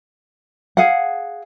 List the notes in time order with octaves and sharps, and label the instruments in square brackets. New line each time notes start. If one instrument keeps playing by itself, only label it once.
[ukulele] G#4 F5 F#5